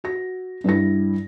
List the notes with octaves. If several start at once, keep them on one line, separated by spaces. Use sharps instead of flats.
F#4 A#6
G2 G3 E4 A#6